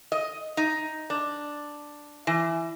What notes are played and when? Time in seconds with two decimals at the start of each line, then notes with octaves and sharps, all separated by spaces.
0.12 D#5
0.57 D#4
1.10 D4
2.27 E3